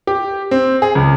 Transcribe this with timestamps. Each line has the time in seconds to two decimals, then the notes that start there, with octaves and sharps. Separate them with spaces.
0.07 G4
0.51 C4
0.82 G#4
0.95 C#2